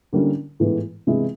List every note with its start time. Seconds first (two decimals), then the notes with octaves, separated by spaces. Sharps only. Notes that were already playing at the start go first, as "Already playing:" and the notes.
0.13 D3 G3 A#3 C#4 E4
0.60 A2 E3 G#3 B3
1.07 C3 E3 G#3 B3 E4